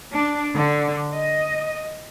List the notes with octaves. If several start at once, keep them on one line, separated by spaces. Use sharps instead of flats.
D4
D3
D#5